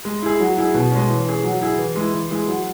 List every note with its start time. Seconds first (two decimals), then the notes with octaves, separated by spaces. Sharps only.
0.05 G#3
0.22 E4 G#4
0.40 F#3
0.57 E4 G#4
0.74 B2
0.92 G#3 C#4
1.09 E3
1.27 C#4 G#4
1.44 F#3
1.61 E4 G#4
1.78 E3
1.96 G#3 E4
2.14 E3
2.31 G#3 E4 G#4
2.48 F#3